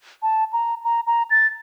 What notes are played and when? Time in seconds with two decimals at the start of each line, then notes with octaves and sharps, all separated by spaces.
0.23 A5
0.53 A#5
0.84 A#5
1.07 A#5
1.31 A6